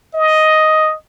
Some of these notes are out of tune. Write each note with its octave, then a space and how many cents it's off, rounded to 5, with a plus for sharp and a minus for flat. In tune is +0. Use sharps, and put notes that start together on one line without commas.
D#5 +5